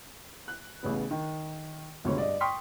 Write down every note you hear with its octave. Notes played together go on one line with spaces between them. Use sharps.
F#6
A1 C#3 B3
D#3
F1 C#2 G#2 B2 D3 C#5
G2 D5 D#5
G5 C6 C#6 D#6 F6 B6